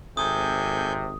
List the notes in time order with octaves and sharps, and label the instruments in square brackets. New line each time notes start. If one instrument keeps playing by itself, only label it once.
[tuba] G#1 [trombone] C3 [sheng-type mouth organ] A4 G#5 G6 [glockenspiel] D#6